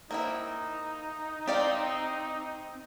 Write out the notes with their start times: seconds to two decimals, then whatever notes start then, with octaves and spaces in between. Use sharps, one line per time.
0.11 A#3 C4 D#4 E4
1.48 C4 G4 D5 F5 G5